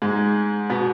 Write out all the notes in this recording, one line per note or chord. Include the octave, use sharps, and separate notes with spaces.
G#2 G#3
B2 B3